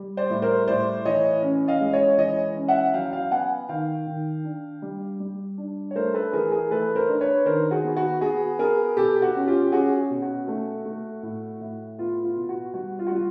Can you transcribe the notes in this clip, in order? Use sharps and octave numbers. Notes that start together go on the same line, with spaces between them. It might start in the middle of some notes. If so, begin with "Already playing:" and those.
Already playing: G3
C5 D5
A2
A#4 C5
A2 C5 D5
E3 C#5 D#5
C#4
D#5 F5
G#3
C#5 D#5
E3 C#5 D#5
C#4
E5 F#5
F#3 F5 G5
F5 G5
B3 F#5 G#5
D#3 F5 G5
D#3
D4
G3
G3
D4
C#5
A3 A#4 C5
A4 B4
E3 G#4 A#4
G#4 A#4
A3 A4 B4
A#4 C5
D4
B4 C#5
D#3 A#4 C5
F#4 G#4
B3
F#4
B3 F#4 G#4
B3 G#4 A#4
B2 G4 A4
F#4
C#4
F4 G4
C#4 F#4 G#4
B2
F#4
A3
A3
A2
A2
B3 F4
F4
B2
F#4
G3 F#4
F4
F#4
G3 F4